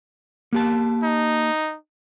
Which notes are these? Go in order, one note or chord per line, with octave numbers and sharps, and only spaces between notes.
A#3 G4 A5
D#4